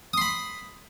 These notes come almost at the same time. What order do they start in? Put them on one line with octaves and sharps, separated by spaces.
D#6 C6 B5